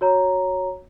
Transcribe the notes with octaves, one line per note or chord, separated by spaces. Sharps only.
F#4 C#5 A#5